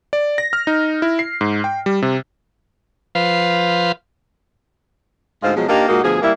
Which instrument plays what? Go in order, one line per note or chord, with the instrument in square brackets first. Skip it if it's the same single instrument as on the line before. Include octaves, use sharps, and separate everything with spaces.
[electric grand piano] D5
A#6
F6
D#4
E4
C7
G#2
G5
G3
C3
[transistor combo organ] F3 B4 C5 F5
[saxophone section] D2 G#2 G#3 F4 C5 F5
B2 F3 F#3 G#3
A#3 D4 D#4 F4 G4 A#4
A#2 G#3 A#3 D#4 F#4
D2 B2 F3 G#4
G3 A#3 E4